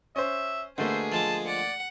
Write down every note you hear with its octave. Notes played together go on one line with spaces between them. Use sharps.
C#4 C5 E5
B2 D3 A3 A#3 G#4 C5
F3 G#3 A5 D6
D5 F#5